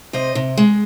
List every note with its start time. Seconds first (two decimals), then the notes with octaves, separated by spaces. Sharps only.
0.13 C3 C5 D#5
0.35 C3
0.57 G#3